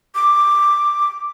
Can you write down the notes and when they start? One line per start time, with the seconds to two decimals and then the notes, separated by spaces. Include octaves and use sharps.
0.15 D6